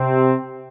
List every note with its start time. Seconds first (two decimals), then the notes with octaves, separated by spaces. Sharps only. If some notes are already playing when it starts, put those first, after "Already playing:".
Already playing: C3 C4